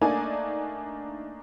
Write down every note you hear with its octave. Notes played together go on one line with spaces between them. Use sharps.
A3 A#3 D4 D#4 D5 G#5